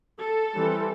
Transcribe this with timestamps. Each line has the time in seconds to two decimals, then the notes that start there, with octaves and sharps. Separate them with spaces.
0.18 A4
0.55 E3 G3 C4